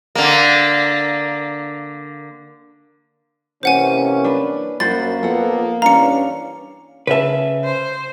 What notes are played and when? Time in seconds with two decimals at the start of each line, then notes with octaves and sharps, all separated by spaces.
0.15 D3 A#3
3.63 C3 E3 A#3 C#4 C5 F#5 G#5
4.24 D4 B4
4.80 F#2 A#3 F#4 C5 B5 A6
5.23 F2 F3 B3 A4 F#5
5.82 G2 E3 C#4 D4 F5 A#5 C#7
7.07 C#3 B4 E5 F#5 A5
7.64 C5